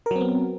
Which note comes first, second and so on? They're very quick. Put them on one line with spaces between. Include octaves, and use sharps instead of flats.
A#4 F#3 C4 B3